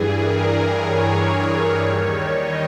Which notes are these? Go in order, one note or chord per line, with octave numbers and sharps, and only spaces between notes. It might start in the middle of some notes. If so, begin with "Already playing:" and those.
Already playing: G2 E3 G3 G#4
A#4
C#5
D#2 D#3 G3
D#5